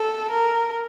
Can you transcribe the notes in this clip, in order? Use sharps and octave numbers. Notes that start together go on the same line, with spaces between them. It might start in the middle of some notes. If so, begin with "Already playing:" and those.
Already playing: A4
A#4